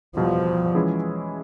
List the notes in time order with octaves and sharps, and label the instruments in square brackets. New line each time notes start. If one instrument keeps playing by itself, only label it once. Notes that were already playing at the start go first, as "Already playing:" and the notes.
[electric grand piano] E2 B2 G3 [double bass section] F3
[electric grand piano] E3 G#3 C#4 E4 G#4